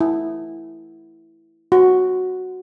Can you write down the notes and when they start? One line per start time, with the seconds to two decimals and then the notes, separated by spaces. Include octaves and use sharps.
0.01 E4
1.72 F#4